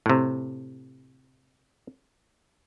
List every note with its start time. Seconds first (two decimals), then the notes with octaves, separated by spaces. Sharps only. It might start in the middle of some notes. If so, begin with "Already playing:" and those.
0.06 A2 C3